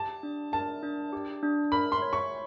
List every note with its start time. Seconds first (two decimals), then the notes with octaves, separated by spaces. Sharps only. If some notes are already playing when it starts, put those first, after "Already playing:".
Already playing: G4 A5
0.23 D4
0.53 A#4 A5
0.83 D4
1.13 G4
1.43 D4
1.72 A#4 B5
1.92 C6
2.02 C#5
2.13 C#6